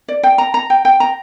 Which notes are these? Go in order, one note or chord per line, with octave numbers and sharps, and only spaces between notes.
D5
G5
A#5
A#5
G5
G5
A#5